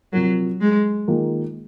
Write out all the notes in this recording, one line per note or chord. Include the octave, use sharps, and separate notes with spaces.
C3 F3 F#3 C4 F4 A#4
G#3
D#3 A#3 F4 G#4